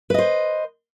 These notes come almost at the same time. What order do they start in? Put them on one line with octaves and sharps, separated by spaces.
B4 D#5 C5